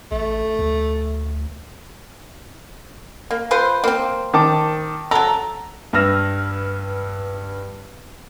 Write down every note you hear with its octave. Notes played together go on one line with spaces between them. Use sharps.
A1 A3
D2
A#3
F4 B4 C5
A#3 C4
D#3 A5 D6
F#3 A4 A#5
G2 B4 E6 F6 A#6